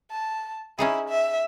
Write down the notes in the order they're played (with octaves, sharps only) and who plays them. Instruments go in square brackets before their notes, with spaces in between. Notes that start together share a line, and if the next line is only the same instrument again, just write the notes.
[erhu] A5
[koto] C#4 D#4 G#4 [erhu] E4
[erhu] E5